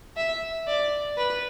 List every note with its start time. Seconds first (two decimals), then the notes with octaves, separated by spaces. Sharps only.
0.17 E5
0.67 D5
1.18 B4